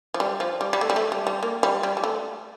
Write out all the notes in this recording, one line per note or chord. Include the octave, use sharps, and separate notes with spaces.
F3
G3
F3
G3
G3
A3
G3
A3
G3
G3
A#3
G3
G3
G3
A3